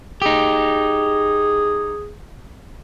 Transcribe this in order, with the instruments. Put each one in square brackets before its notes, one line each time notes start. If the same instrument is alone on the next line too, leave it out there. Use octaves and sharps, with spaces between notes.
[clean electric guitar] D#4 G4 [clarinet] G#4